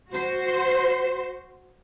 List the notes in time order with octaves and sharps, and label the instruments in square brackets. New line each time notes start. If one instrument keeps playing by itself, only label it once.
[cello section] F#4 C5